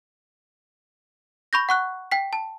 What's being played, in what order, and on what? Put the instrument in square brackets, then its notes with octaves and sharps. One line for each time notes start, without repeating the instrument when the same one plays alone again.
[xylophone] B5 C#6 G6 A#6
F#5 C#6 F#6
G5 B6
A5